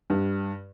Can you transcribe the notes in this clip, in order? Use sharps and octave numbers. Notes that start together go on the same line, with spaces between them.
G2